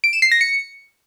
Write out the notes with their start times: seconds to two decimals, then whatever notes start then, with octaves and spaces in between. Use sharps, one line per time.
0.04 D7
0.13 E7
0.22 C7
0.32 A#6
0.41 C#7